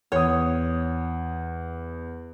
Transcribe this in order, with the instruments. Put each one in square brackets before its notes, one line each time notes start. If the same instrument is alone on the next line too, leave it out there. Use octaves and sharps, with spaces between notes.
[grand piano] E2 D#6 [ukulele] C#5